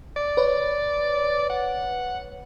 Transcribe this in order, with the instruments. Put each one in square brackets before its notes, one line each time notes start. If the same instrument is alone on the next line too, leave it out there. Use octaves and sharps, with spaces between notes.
[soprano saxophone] D5
[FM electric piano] B4 C#5
[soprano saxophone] F#5